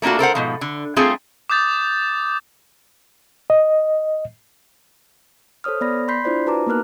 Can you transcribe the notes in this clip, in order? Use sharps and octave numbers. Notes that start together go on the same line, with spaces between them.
A3 A#3 D4 F4 F#4
A4 A#4 C5 F#5
G#2 B2 F3
D3
G3 A3 C4 F4 G#4 A4
D6 D#6 G6 A6
D#5
A4 C5 C#5 D#6 F6
B3 D5 B5 A#6
B5 C6 G6 B6 C7
D4 E4 F4 C5 D5
F#4 B4 A5 A#5 D6
A#3 B3 D#4 A#4 F6 F#6